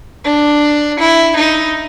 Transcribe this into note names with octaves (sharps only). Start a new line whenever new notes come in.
D4
E4
D#4